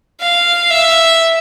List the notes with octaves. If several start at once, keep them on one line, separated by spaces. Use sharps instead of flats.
F5
E5